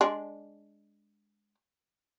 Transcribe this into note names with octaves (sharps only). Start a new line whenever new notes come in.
G#3 D4